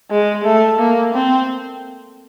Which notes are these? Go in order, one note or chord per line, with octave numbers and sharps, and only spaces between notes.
G#3
A3
A#3
C4